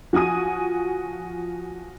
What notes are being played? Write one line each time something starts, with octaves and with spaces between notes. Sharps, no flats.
F3 F#4 G#5 D#6 D#7